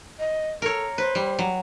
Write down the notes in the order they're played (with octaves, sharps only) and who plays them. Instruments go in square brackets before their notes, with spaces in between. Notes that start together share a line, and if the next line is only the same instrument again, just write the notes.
[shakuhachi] D#5
[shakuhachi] A4 [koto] A#4 C#5
[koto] B4 [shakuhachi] C5
[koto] G3
F#3